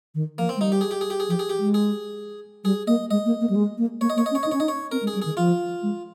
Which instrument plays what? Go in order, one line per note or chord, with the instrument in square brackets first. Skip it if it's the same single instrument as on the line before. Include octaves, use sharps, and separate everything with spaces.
[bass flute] D#3
[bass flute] F3 [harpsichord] A#3
[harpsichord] C4
[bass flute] G#3
[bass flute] G3 [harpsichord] D#4
[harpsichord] G4
G#4
G4
G#4
G4
G#4
[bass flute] F3 [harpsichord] G4
[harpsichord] G#4
G4
[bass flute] G#3
[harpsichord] G#4
[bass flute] G3 [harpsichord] G#4
[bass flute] A#3 [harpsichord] D#5
[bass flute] G#3 [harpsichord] D#5
[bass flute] A#3
A#3
G3
G#3
A#3
[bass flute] A#3 [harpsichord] C#5
[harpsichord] D#5
[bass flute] A#3 [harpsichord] C#5
[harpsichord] D#5
[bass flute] C#4
[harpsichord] C#5
[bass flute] D#4 [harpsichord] D#5
[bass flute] C#4 [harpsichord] C#5
[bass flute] D#4 [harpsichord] D#5
[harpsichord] C#5
[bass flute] C4 [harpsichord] A#4
[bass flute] G#3
[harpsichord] G#4
[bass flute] G3
[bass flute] D#3 [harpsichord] G#4
[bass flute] F3 [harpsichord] F4
[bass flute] G#3